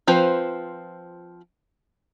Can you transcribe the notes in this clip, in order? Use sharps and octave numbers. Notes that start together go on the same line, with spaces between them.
F3 C4 F4 B4 C5